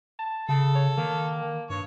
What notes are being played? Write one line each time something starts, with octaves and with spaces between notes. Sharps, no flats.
A5
C#3 A4
C#5
D#3 A#3
G2 C#5